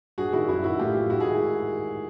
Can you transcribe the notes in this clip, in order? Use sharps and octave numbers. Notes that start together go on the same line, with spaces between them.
G2 F#4 G#4
D#3 E4 F#4
F#2 E4 F#4
D#3 E4 F#4
A2 F4 G4
E3
G#2 E4 F#4
F#4 G#4
D#3